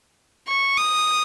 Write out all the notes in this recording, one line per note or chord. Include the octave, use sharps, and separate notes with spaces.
C#6
D#6